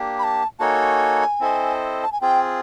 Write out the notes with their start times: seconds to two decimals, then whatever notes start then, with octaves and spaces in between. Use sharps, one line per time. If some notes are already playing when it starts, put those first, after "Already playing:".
Already playing: A#3 D4 G4
0.19 B5
0.24 A5
0.59 A#3 D#4 F#4 A4 C#5 G#5 A5
1.40 C4 E4 A4 C5 D#5
2.03 A5
2.12 G#5
2.21 C4 F4 G#4 G5